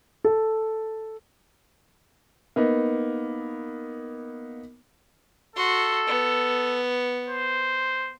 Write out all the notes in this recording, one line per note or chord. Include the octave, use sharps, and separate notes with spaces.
A4
A#3 B3 D#4
F#4 A4 C6
B3
C5